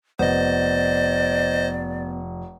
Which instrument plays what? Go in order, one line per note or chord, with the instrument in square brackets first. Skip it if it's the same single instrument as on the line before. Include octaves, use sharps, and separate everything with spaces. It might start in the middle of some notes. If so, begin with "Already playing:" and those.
[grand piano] F1 [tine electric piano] B3 [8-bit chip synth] C5 D#5 [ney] D5